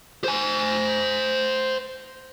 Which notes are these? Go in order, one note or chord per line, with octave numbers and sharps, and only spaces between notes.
C5 G#5